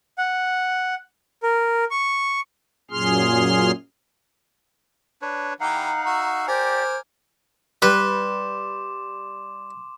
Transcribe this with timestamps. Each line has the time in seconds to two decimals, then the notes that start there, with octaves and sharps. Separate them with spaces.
0.18 F#5
1.43 A#4
1.91 C#6
2.91 F#2 A#2 G#4 C6 F6
5.22 D4 B4 C#5
5.60 E3 D#4 G4 F5 F#5 A#5
6.06 F#4 E5 C#6
6.48 G4 A#4 C5 D5 G#5 D6
7.82 G3 B4 C6 D6 E7